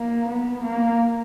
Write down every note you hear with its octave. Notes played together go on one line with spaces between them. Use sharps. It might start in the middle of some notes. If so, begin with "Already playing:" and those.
Already playing: A#3
B3
A#3